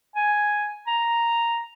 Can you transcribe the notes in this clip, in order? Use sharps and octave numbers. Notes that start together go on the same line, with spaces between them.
G#5
A#5